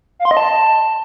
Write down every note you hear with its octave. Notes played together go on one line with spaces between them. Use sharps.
F5
C6
D#5
A5